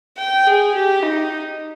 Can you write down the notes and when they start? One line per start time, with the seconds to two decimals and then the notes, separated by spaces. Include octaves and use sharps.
0.18 G5
0.47 G#4
0.75 G4
1.03 D#4